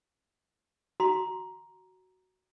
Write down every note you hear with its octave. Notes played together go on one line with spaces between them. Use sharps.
F#4 A#5 C6